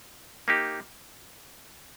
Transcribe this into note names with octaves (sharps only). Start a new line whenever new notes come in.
A#3 D#4 G4